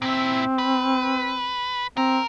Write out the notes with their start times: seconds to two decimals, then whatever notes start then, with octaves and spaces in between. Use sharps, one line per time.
0.02 A#2 C4 E4
0.58 B4
1.97 C4 A#4